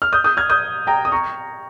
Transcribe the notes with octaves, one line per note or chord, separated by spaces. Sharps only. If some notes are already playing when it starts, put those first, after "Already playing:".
F6
D#6 G6
D#6 G6
F6 G#6
D#6 G6
G5 A#5
D#6
A#5 C#6